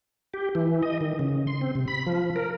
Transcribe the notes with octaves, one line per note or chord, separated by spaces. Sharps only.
G4
E3
D#5
D#3
C#3
C6
C4
C3
B5
F3
A#4